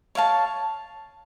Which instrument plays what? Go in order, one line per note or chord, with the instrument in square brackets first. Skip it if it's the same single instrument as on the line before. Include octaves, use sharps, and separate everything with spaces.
[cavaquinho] C#5 F5 A5